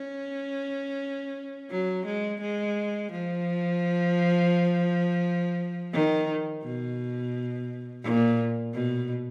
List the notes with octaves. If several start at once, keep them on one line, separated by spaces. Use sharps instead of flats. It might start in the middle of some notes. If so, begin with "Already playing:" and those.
Already playing: C#4
F#3
G#3
G#3
F3
D#3
B2
A#2
B2